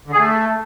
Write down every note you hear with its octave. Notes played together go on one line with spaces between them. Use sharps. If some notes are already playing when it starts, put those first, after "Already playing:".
D3
G#4
A3